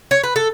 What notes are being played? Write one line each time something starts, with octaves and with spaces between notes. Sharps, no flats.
C#5
B4
A4